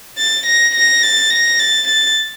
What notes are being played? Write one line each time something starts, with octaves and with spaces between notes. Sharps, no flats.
A6
A#6
A#6
A6
A#6
A6
A6